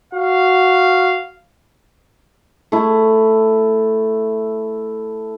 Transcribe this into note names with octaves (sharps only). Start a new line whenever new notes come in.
F#4 F5
A3 E4